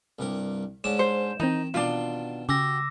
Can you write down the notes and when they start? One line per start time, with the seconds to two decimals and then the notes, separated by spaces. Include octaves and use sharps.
0.19 C2 G2 A#4
0.84 G#2 C#4 D4 E7
0.99 C5
1.40 D#3 E3 C4 D#4
1.74 B2 D#3 D4 F4 C6
2.49 C#3 F#4 G4 D6 E6 A#6